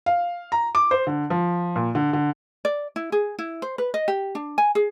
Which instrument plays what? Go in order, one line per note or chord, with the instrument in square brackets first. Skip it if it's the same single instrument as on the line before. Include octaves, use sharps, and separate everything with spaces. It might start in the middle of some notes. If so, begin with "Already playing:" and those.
[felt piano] F5
A#5
D6
C5
D3
F3
A#2
D3
D3
[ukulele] D5
E4
G#4
E4
C5
B4
D#5
G4
D4
G#5
G#4